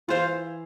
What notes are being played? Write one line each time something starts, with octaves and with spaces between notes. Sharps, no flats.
E3 E4 F4 C5 F5